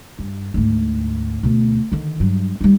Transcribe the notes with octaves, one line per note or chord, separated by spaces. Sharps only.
G2
D2 G#2
D2 B2
D3 D#3
G2 F#3
G3 D#4